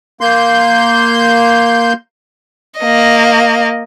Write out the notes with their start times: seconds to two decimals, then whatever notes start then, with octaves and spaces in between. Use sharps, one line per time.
0.21 A#3 C6 G6
2.80 A#3 D#5